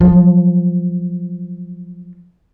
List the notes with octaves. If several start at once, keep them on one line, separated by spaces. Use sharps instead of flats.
F3 F#3